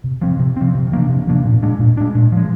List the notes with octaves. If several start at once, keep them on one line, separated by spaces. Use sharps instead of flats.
C3
F3 C4
C3
F3 C4
C3
F3 A#3 D4
C3
F3 A#3 D4
A#2
G#3 D4
A#2
G#3 D4
A#2
F3 G#3